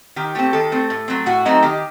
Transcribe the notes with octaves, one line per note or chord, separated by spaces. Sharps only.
D#3 G4
A3 C4 G4
D#3 A4
A3 C4
A2
F#3 A3 C4
A2 F#4
F#3 A3 C4 D#4
D#3 G4